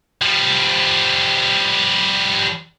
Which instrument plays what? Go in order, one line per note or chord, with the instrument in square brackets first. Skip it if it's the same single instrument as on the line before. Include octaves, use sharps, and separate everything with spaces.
[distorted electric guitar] F3 G3